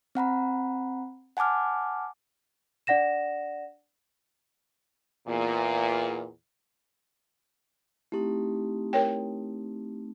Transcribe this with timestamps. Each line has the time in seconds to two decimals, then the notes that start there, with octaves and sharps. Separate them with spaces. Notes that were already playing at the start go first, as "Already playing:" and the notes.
0.15 C4 F#5 A#5 B5
1.37 F#5 G#5 A5 D6 F6
2.87 D4 D5 F#5 A#6 E7
5.28 E2 A#2
8.12 A3 C4 D#4 E4 G4
8.93 A#4 C#5 G5